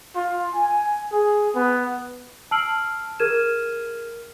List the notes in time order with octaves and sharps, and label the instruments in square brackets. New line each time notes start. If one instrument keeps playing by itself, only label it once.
[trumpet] F4
G#5
G#4
B3
[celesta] A5 E6 F6 C7 D7 F#7
G#4 A#4 F6 G#6 D#7 E7